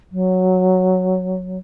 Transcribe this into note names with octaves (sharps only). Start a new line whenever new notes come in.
F#3